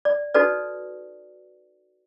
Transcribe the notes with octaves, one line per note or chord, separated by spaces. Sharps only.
D5
D#4 F#4 A4 B4 D5